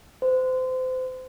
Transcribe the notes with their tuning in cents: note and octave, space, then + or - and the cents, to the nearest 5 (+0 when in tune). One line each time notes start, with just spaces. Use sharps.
C5 -30